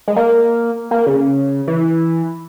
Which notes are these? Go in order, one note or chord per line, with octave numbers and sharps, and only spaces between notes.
G#3
A#3
A#3
C#3
E3